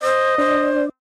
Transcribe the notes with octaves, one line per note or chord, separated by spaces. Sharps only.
C5 D#5
D4 C5